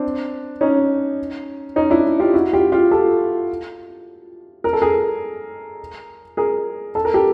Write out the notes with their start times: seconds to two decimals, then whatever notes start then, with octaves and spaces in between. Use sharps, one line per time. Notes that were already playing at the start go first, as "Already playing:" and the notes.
Already playing: C4 D4
0.61 C#4 D#4
1.76 C#4 D#4
1.90 D4 E4
2.20 F4 G4
2.34 E4 F#4
2.53 F4 G4
2.72 F4 G4
2.91 G4 A4
4.64 A#4
4.73 A4
4.82 G#4 A#4
6.37 G#4 A#4
6.95 A4
7.05 A#4
7.14 G4 A4